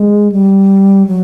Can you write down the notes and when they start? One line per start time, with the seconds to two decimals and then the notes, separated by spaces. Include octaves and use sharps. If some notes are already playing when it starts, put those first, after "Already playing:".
Already playing: G#3
0.32 G3
1.07 F#3